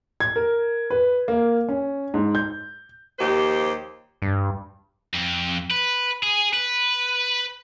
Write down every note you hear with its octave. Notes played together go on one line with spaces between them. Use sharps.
G#6
A#4
B4
A#3
C#4
G#2
G6
D#2 F3 D#4 G4 C5
G2
F2
B4
G#4
B4